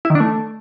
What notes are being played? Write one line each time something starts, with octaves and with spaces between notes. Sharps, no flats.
E4
D#3
D4
A3